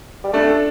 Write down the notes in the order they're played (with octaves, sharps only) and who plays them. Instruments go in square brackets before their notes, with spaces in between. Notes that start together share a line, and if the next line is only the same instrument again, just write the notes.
[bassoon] G3
[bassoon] A3 [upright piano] D4
[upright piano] A4